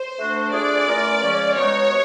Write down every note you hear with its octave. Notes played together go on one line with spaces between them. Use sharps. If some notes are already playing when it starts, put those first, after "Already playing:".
Already playing: C5
A3 D4 F#4
A3 D4 F4 G#4 D5
E3 A3 C#4 F4 A#4
C#3 F3 G#3 C#4
B2 G#3 B3 D#4 F#4 C#5
C3